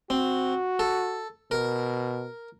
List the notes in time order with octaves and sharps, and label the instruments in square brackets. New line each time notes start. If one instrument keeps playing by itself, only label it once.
[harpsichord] C4 [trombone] F#4
[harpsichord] A4
[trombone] B2 [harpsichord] A#4